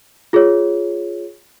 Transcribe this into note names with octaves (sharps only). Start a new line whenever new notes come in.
F4 G#4 C#5